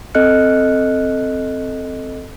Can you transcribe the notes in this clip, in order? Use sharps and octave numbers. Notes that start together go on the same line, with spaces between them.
C4 A4 D#5 F6 F#6 C#7